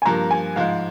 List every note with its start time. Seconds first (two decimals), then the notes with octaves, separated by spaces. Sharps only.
0.02 G#5
0.05 G2 F3 A#3 A#5
0.31 G#5
0.56 G#2 F3 G#3 F5